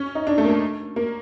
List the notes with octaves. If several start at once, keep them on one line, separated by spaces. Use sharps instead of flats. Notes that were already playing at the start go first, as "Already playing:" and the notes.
Already playing: C#4
D#4
D4
A3
A#3
A3
A#3